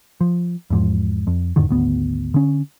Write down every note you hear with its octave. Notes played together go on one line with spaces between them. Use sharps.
F3
E2 G#2 F3
F2
E2 G#2 D3 D#3
G#1 D2 B3
D3 C#4